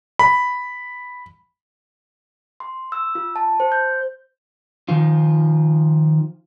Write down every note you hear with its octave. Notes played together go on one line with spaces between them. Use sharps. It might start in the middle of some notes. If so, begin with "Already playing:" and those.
B5
C6
E6
F4
A5
C5
G6
D#3 F3 F4